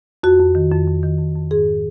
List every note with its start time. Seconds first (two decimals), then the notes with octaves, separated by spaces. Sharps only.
0.23 F2 F#4
0.40 F2
0.55 D#3
0.71 F2
0.87 F2
1.03 D#3
1.19 F2
1.35 F2
1.51 G#2 G#4